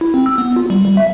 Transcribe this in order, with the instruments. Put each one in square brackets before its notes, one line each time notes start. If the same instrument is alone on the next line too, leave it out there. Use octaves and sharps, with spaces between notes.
[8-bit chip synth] E4
C4
E6
B3
F4
G3
G3
E5